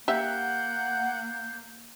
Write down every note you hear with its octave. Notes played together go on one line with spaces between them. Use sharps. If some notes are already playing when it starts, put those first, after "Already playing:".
A#3 G4 E5 F#5 G6